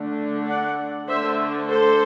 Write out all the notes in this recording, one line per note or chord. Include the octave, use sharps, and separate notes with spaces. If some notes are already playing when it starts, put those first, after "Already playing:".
Already playing: D3 A3 D4
D5 F#5
D3 A3 D4 C5 E5
A4 C5